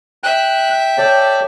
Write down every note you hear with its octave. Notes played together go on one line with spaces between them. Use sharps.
E5 G5 F#6
G4 A4 C#5 D5